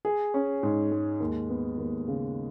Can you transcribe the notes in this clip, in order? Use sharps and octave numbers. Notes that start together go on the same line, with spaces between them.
G#4
C#4
G#2
G#3
D#2
B3
D#2
C#3